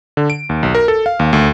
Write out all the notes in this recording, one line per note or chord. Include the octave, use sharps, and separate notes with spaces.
D3
D7
D#2
B1
A#4
A4
F5
D#2
D2